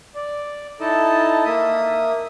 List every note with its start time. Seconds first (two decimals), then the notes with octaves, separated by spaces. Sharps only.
0.15 D5
0.80 D#4 E4 A4 D#5 A5
1.45 A#3 E5 D#6